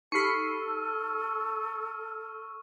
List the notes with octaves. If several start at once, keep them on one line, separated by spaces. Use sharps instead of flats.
D#4 G4 A4 B5 C#6 F6 C7 C#7